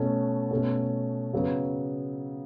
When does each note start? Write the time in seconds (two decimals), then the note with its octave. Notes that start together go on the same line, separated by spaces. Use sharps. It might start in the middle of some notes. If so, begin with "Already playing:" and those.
Already playing: B2 A3 C#4
0.51 B2 A3 C#4
1.33 C#3 F#3 B3